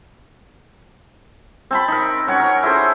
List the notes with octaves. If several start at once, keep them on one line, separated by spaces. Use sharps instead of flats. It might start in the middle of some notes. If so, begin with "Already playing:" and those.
C4 A5 B5
D#4 A#4
C#4 F#4 C#5
A#4
E4 G#4 A4 C5